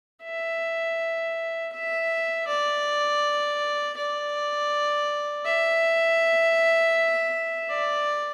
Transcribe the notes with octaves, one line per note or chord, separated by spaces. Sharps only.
E5
E5
D5
D5
E5
D5